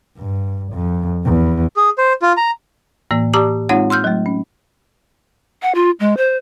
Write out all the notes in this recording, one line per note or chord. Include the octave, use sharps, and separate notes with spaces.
G2
F2
E2
G#4
C5
F4
A#5
A2 E3 A#3
G4 D5 A5 A#5 D6 D#6
G#3 C4 D#4 F4 C#5 F#5
C6 E6 F6 G6
F#3 A3
C#4
F#5
F4
G#3
C5